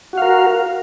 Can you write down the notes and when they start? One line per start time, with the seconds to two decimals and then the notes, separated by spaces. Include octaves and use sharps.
0.13 F#4
0.18 F5
0.22 A#4